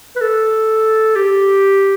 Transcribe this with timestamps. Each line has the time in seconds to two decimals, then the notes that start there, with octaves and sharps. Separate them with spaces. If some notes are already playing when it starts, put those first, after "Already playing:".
0.16 B4
0.21 A4
1.16 G4